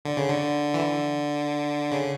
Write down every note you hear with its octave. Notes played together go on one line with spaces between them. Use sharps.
D3
C#3
D3
E3
D3
C#3